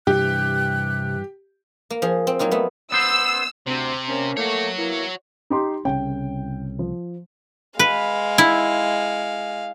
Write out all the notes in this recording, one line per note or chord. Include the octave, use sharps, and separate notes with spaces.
G2 C3 E3 G4 F#6
A#3
F3 G#4
C4
F#3 A#3 D#4 F4
A3 B3
B3 C5 E6
D2 C3 C4
A#3 C4 C#4
A3 A#3 F#4 C#5
A#3 B3 E4
D#4 G4 C6
C2 C#3 C#4 G5
F3
G#3 B4 F5
E4